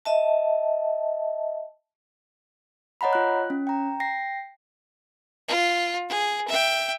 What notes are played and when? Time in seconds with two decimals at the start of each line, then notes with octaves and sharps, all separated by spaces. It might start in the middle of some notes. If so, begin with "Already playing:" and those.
0.05 D#5 E5 A5
3.01 C#5 D#5 F#5 A#5 B5
3.13 F4 F#6
3.50 C#4
3.67 G5 A#5
4.00 G5 A#6 C7
5.48 F4
6.09 G#4
6.47 E5 G5